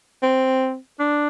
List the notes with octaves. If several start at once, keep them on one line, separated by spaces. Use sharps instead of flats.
C4
D4